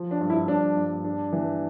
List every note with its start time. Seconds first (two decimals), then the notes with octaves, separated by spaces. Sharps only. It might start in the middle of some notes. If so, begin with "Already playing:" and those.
Already playing: F3
0.11 D4
0.21 G2
0.30 E4
0.48 G2 D4
0.77 G2
1.04 D4
1.32 E3